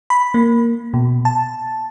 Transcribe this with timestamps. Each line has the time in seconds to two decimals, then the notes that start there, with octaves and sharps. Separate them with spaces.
0.10 B5
0.34 A#3
0.94 B2
1.25 A5